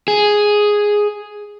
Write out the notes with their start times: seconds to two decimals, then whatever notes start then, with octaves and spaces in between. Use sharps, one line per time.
0.08 G#4